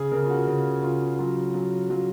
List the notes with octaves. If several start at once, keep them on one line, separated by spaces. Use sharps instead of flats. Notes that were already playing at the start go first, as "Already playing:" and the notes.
Already playing: C#3 G#4
C#3 A#4
F4
F#4
C#3
C#3 F4
F#3 F4
F#3
F#3 F4